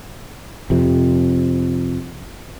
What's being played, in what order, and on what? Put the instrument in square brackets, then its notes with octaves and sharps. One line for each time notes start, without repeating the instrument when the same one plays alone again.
[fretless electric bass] F2 C3